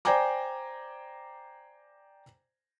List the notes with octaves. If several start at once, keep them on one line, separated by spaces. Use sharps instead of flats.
C5 D5 G5 G#5 A#5 D6